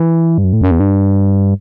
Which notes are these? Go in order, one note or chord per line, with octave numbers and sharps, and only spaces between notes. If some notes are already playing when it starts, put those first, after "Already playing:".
Already playing: E3
G2
F#2
A2
F#2
E2
G2